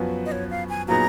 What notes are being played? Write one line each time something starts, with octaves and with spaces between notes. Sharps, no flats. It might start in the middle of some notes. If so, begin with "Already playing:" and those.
Already playing: F#2 F3 B3 F#4 B4
D#5
C#5
F5
G#5
A#2 F#3 B3 D#4 G#4 A#5